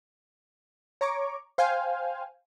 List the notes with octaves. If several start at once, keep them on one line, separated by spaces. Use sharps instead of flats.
C#5 A#5 C#6 D6
C5 F5 G5 G#5